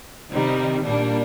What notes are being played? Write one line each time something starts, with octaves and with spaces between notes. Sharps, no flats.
C3 D#3 G3 C4 D#4
A#2 G3 A#3 D4